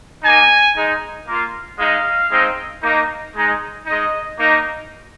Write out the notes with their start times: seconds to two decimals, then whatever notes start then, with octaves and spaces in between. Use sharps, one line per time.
0.23 A#3 D#4 G#5
0.75 G#3 D#4
1.27 A#3 F4
1.78 G#3 D#4 F5
2.30 G#3 C4 D#4
2.82 A#3 D#4
3.34 G#3 D#4
3.86 G#3 D#4 D#5
4.38 A#3 D#4